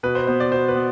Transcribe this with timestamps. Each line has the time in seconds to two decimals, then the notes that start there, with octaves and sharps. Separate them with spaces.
0.03 B2 B4
0.15 C5
0.27 B3 C5
0.40 D5
0.52 B2 C5
0.68 B4
0.76 B3